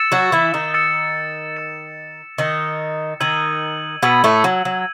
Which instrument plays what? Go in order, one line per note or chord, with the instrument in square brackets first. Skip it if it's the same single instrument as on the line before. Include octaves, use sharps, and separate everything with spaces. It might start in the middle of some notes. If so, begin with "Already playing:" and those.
Already playing: [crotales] E6 A6 C#7 E7
[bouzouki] F#3 F#4
E3 E4
D#3 D#4
[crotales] E6 A6 C#7 E7
E6 A6 C#7 E7
[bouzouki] D#3 D#4 [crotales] E6 A6 C#7 E7
[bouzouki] D#3 D#4 [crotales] E6 G#6 D#7 F#7
[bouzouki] B2 B3 [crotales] E6 G#6 D#7 F#7
[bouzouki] A2 A3
F#3
F#3